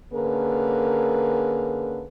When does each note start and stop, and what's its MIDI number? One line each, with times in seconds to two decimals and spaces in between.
0.13 2.06 50
0.13 2.06 58
0.13 2.06 61
0.13 2.06 68
0.13 2.06 70
0.13 2.06 71